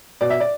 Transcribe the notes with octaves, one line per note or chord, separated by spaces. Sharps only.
B2 D5
E5
D5